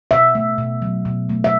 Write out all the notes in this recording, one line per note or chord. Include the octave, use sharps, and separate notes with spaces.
B2 E5
A3
B2
F#3
B2
A3
E5